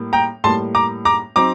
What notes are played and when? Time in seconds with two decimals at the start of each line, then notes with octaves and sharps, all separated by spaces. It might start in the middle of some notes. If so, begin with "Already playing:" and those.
Already playing: A2 G3 A#3
0.13 G5 A#5
0.44 A2 G3 A#3 A5 C6
0.75 A#5 D6
1.05 A#5 D6
1.36 F#3 C4 D#4 A#5 D6